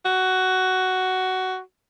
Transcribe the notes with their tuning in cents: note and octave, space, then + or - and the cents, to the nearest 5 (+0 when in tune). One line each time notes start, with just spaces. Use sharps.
F#4 +10